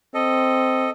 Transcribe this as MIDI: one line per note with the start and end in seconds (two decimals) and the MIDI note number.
0.14 0.89 60
0.14 0.90 69
0.14 0.90 75